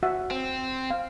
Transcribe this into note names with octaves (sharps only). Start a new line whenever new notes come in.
F#4 E5 F#5
C4
F5